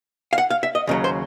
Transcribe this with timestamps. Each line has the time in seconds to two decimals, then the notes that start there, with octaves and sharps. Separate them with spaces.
0.33 F5
0.38 F#5
0.50 F5
0.63 E5
0.75 D#5
0.87 D#2 C#3 F#3
1.04 C5